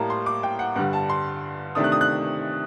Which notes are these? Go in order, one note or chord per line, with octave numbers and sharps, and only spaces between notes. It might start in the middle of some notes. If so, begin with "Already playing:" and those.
Already playing: A2 G3 A#3 A5 A#5
C6
D6
G5
F#5
G2 D3 G3 F#5
A5
C6
C3 D#3 A3 D4 D#6
F#6
D#6
F#6